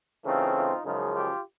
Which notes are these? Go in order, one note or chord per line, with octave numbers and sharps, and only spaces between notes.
C#3 E3 A3 C4 D#4 F4
D#4 F4
F#2 C#3 F3 G#3 D#4 F4
F4 G4